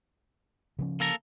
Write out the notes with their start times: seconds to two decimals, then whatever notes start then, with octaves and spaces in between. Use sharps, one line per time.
0.79 C#3 F3 C#4
1.00 A#3 A4 A#5